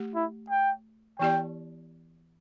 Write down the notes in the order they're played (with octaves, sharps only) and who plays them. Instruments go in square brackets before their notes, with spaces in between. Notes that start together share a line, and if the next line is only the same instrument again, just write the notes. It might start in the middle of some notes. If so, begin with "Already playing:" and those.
Already playing: [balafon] A3 G4
[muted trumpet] E4
G5
[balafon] E3 B3 E4 G4 D5 [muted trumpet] G5